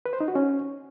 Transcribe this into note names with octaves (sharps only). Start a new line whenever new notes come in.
B4
C5
D#4
F#4
C#4